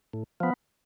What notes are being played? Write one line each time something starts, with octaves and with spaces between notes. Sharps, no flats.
A2
F3 B3